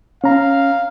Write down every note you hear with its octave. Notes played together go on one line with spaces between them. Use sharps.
C#4 F5 A#5